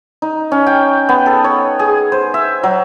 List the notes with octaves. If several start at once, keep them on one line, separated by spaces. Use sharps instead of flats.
D#4
C#4
G5
B3
A4
C#5
G#4
C5
E5
F#3